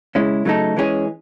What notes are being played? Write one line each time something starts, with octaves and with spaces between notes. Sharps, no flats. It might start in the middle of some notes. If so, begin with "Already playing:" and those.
C#3 G#3 C#4 E4
C#3 F#3 A3 D#4 A4
E3 G#3 C#4 G#4